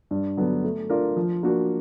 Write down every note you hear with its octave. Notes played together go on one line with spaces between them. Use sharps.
G2
D3 F#3 B3 D4
A3
D4 F4 A#4 D5
F3
A#3 D4 F#4